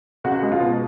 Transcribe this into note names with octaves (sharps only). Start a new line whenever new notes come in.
C#2 F#4
G#3
F4
B2